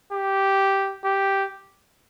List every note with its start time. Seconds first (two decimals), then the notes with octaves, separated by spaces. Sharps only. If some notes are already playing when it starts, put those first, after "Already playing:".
0.13 G4
1.04 G4